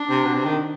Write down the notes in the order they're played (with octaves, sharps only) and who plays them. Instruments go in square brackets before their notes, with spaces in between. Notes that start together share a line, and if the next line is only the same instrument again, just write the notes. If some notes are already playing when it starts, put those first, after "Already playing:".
Already playing: [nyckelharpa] D4
[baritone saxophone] C3
B2
C3
D#3